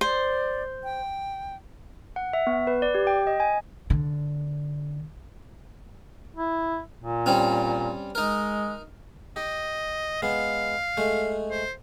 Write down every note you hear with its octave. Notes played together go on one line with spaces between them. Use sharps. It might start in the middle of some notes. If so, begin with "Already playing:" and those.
C5 D5
G5
F#5
E5
B3
B4
D5
G4
G5
D#5
G#5
D3
E4
A#2
G3 C4 C#4
G#3 D#4 A#4
G4 D#5
G#3 B3 F5
G#3 A3
C5